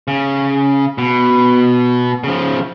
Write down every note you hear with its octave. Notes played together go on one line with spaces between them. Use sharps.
C#3
B2
C#3 F3